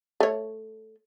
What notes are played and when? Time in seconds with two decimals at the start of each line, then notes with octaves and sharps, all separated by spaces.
0.20 A3 C#5